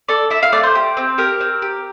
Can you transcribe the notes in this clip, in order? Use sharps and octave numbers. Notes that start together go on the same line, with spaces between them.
A4 D5
E4 E5
F5
A3 D5
C5
G4
C4
G4 A#4
C4
G4